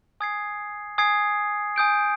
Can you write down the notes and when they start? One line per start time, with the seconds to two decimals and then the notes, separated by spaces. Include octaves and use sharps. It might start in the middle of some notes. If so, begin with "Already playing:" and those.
0.20 G#5 D#6 G#6 C7
0.98 G#5 D#6 G#6 C7
1.76 G#5 D#6 G6 D7